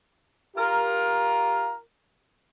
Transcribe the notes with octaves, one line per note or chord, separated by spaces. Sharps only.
F4 G4 A#4